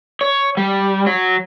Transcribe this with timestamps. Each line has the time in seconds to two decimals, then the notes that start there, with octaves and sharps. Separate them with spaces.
0.21 C#5
0.57 G3
1.06 F#3